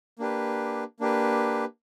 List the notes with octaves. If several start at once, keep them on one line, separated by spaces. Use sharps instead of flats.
A#3 D4 G4 B4
A#3 D4 G4 B4